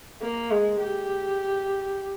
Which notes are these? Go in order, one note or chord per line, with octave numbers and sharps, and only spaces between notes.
A#3
G#3
G4